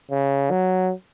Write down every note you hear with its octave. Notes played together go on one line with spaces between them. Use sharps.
C#3
F#3